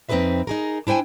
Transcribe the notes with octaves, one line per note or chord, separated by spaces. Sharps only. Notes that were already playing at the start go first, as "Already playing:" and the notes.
F2 C4 D#4 G#4 B4 E5
D#4 G#4 A#4
D4 E4 C5 G5 G#5